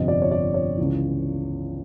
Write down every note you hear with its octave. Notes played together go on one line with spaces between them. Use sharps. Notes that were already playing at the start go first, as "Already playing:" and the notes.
Already playing: G1 F2 C3 F3 D#5
D5
C#5
D5
C#5
C#2 C#3 E3